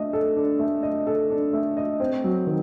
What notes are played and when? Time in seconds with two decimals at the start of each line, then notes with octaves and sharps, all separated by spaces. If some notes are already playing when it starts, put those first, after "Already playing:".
Already playing: A3 D4 D#5
0.13 A4
0.36 D4
0.59 A3
0.83 D#5
1.07 A4
1.30 D4
1.53 A3
1.77 D#5
2.00 C4
2.24 F#3
2.47 D#3